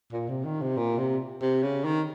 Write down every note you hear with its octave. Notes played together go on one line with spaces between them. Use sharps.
A#2
C3
D#3
C3
A#2
C3
C3
C#3
D#3